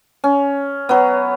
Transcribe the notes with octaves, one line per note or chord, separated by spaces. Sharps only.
C#4
F#3 B3